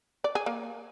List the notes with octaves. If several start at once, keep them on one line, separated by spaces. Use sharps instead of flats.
D5
G#4
A#3